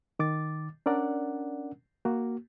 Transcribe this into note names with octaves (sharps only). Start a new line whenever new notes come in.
D#3 D6 A6
C#4 D4 A#4 D5 F#5
A#3 F#4